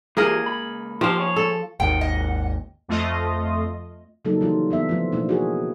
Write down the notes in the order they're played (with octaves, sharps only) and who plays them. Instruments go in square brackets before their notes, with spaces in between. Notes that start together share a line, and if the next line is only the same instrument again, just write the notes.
[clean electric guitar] E3 F4 G4 [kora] A#3 G#4 A#4
[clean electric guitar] C#2 B5
[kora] F3 F5 [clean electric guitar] F4 G4 C5
[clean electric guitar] G#4 C#5
[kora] A4
[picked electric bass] G#1 D#2 D#3 [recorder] F#5 [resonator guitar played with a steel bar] G5
[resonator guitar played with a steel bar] D#5
[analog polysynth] F2 A3 F4 D#5
[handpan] C#3 F#3 G3 A#3 D#4 A4
D#3 E3 G3 F4
E3 B3 E5
F3 A3 F4
B2 A#3 D4 E4
F#4 G#4 A#4